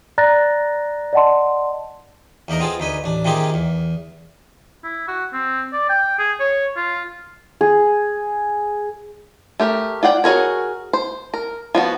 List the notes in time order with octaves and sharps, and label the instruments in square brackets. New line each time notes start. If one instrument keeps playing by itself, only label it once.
[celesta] D5 A#5 F#6 A6 A#6
D5 D#5 F#5 A5 C6
[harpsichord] E2 A#3 D#4 A#4 A#5
B3 C4 F4 G#4 A4
D2 D#4 B4 G#5
A1 D4
C3 D#3 A#3 F4 G4 G#4
E2
[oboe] E4
F#4
C4
D5
G5
G#4
C#5
F4
[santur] G#4
[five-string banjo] A3 G4 A#4
F4 D5 F#5 G5
F#4 G#4 A#4 C#5
C5
A#4
F3 B3 F#4